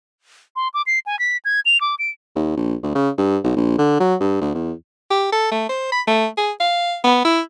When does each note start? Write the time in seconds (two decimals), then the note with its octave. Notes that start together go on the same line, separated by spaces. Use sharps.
0.56 C6
0.74 D6
0.86 C7
1.06 G#5
1.19 B6
1.45 G#6
1.66 F7
1.81 D6
1.99 D7
2.35 D#2
2.57 A#1
2.83 D2
2.95 C#3
3.18 G2
3.44 B1
3.56 A#1
3.78 D3
4.00 F#3
4.20 G2
4.41 D2
4.54 E2
5.10 G4
5.32 A4
5.51 A3
5.69 C5
5.92 B5
6.07 A3
6.37 G#4
6.60 F5
7.04 B3
7.25 E4